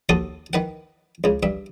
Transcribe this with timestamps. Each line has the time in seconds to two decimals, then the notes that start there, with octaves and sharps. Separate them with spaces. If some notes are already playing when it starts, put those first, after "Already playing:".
0.09 D#2 F#4 A4 C6 D#6
0.53 D#3 B4 F#5
1.24 C#2 C#3
1.43 G2 E5